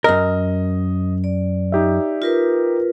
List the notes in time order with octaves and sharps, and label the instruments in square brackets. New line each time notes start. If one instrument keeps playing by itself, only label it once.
[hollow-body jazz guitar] F#2 A#4 [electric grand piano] D#5
[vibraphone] D5
[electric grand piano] D#4 G4 E5
[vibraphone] F4 A#4 B4